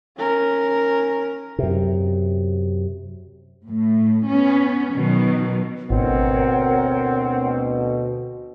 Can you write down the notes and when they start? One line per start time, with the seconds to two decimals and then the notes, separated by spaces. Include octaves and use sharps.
0.17 C#4 A#4
1.59 F#2 C3
3.66 A2
4.28 B3 C#4
4.93 B2 D#3 F#3
5.90 G#1 D2 B2 C4 A#4 C#5 F#5